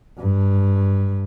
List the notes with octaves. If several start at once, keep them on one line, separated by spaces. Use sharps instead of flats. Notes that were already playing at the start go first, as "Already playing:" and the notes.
G2